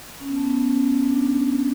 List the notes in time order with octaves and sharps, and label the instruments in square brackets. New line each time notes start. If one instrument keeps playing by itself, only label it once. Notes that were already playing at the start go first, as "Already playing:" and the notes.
[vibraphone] C#4
B3
A3
B3
C#4
D4